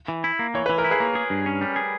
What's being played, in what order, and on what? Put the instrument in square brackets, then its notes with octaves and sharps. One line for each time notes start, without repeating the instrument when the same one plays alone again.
[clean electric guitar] E3
E4
A#3
[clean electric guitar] E3 [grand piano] C#5
[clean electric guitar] E3 [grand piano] B4
[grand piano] A#4
[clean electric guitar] E4
[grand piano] G#4 B4
[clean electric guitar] A#3
G#4
G2
C#4
G3
G#4